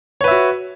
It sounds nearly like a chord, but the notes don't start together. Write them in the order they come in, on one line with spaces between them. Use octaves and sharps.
C#5 B4 E5 F#4